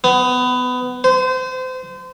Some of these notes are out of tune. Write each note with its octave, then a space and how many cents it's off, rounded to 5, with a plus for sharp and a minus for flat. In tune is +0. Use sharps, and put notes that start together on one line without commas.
B3 +20
C5 -30